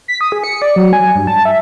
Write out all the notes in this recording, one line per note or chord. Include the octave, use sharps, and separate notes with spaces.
B6
D#6
G#4
C#7
D5
F#3
G#5
G2
A5
E5